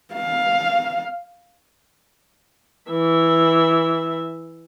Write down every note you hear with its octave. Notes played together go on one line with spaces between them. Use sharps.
F5
E3 E5